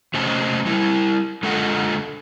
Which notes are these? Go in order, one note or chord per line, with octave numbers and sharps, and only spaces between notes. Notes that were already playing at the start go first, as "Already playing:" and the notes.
C3 A3 C#4 C5 D#5 A5
G3 E4
D3 G#3 F4 A4 D#5 F#5